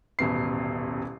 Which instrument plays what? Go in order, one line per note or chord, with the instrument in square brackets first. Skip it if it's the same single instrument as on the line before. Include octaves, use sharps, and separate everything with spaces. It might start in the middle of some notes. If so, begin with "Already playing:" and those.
[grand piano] D#1 A1 B2 B3 C7